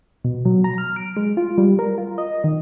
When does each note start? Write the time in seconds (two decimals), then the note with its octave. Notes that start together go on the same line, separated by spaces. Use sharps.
0.25 B2
0.45 F#3
0.64 A#5
0.78 F6
0.96 D7
1.17 G#3
1.37 F4
1.58 G3
1.79 A#4
1.98 F4
2.18 D#5
2.44 D#3